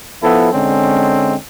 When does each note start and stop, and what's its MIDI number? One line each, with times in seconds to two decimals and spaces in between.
0.22 0.51 53
0.22 0.51 59
0.22 0.51 64
0.22 0.51 69
0.52 1.35 50
0.52 1.35 56
0.52 1.35 60
0.52 1.35 61